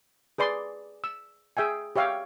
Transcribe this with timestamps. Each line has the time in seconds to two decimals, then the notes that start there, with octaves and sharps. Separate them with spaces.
0.38 G#4 B4 D5 C6
1.04 E6
1.57 G#4 E5 G5 G#5
1.96 G4 C#5 E5 F5 G5